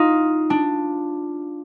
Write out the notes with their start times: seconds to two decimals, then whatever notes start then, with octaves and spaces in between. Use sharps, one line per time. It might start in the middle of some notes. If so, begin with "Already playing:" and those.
Already playing: D#4 F4
0.50 D4